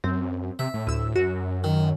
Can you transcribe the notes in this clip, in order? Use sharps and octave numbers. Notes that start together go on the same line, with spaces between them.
F#2 C4
C3 E5
A2
D2 E6
F#2 F#4
D#3